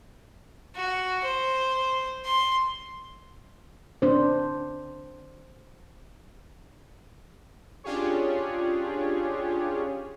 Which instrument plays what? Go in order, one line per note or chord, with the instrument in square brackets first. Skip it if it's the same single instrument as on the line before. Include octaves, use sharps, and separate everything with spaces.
[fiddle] F#4
C5
C6
[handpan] D4 C5
[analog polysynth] C#4 D4 F4 G4 G#4 C#5